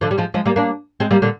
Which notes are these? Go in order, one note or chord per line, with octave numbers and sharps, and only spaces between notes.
D3 F3
G3
F3 G#3
F3 G#3
G3 A#3
A#3 D4
G#3 C4
G3 A#3
A#2 D3